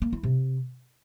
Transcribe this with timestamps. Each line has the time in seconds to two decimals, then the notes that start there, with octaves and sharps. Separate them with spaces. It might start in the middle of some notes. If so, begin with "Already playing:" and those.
0.02 A#3
0.13 E4
0.23 C3